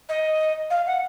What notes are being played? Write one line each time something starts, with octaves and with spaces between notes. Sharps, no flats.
D#5
F5
F#5